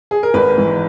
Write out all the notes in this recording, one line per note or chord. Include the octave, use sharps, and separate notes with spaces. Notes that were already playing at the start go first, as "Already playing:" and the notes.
G#4
A#4
G#1 B4
G#2 E3